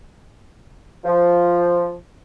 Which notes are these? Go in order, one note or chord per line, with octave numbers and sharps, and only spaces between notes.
F3